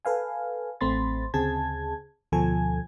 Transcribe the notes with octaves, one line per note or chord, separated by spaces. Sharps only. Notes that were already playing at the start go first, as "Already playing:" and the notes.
A4 B4 F5 G#5
A1 A3 C4 B5 C6 A6
D2 C#3 C4 G#4 A5 G#6
D2 B2 F3 A4 G#5 G#6